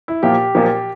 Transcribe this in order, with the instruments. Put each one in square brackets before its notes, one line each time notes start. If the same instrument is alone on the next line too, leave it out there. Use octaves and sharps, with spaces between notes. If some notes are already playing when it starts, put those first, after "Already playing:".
[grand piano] E4
A#2 F3 A#3 G4
A#2 F3 A#3